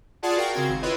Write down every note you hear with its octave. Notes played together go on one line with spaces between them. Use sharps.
F4 G#4 D5 F#5 A5
F#4 A#4 F5 G5
C#3 C4 G#6
G#1
E4 F4 B4 C#5 D#5